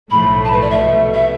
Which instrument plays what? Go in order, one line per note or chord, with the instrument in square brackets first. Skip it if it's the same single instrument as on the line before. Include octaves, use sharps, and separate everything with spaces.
[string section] B1 A2 F3 A3 [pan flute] B5
[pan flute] A5
B4
D5
E5
[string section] C2 B2 A3
[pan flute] E5